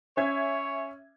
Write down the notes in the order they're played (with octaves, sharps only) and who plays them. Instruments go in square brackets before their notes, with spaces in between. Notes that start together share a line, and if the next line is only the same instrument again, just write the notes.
[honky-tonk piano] C#4 E5 G#6 [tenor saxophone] C#5